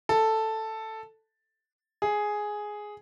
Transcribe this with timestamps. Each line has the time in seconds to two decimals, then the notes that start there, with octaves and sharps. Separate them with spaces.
0.09 A4
2.02 G#4